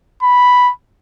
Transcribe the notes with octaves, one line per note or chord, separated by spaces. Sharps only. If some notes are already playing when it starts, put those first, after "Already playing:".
B5